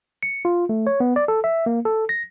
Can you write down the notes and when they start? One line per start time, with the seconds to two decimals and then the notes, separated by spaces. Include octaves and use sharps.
0.23 C#7
0.45 F4
0.69 A3
0.87 C#5
1.00 B3
1.16 D5
1.28 A4
1.44 E5
1.66 A#3
1.85 A4
2.09 A#6